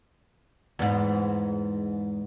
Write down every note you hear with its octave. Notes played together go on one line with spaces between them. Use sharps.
E2 G#2